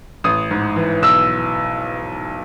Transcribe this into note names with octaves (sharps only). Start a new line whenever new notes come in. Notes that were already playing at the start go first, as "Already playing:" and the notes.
A1 D#6
G#2
E3
B1 E6